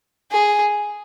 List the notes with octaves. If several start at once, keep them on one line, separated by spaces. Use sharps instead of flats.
G#4